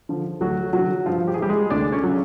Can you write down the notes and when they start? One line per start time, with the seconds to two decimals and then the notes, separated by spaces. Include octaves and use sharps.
0.09 D3 F3
0.41 D2 F#3 F#4
0.73 F#3 F#4
0.78 D3
1.06 G2 F3 F4
1.28 G4
1.34 G#4
1.38 E3 G3 G4
1.49 G#3 G#4
1.70 D2 D4 D5
1.92 C#4 C#5
2.04 C#3 F#3